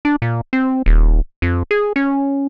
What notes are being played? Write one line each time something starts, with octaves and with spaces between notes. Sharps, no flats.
D4
A#2
C4
D#1
F2
G#4
C#4